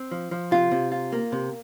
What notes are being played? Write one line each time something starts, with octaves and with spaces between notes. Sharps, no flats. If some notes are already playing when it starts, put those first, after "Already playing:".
Already playing: C4
F3
F3
C3 F4
C3
F4
A#3
C3